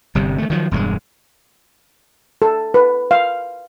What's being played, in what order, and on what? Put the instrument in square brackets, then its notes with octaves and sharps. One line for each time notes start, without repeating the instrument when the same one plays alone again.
[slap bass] G1 C3 G3
D#3 A3
D#3 F3 F#3
E1 G2 G3 G#3
[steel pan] A4
B4
F5